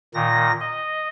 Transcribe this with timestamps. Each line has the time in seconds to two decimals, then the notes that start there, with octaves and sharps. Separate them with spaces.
0.14 A#2 D#3 A#6
0.60 D#5